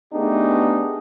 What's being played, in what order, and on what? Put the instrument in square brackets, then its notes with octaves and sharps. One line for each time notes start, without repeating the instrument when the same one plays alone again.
[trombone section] A3 B3 D4 D#4 G4 G#4